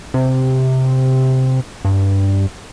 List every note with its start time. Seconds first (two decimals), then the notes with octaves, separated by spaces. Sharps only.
0.14 C3
1.85 G2